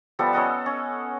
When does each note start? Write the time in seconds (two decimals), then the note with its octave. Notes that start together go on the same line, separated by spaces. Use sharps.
0.19 F3 G3 B3 A4
0.33 C#4 A4 D#5 F#5
0.66 C#4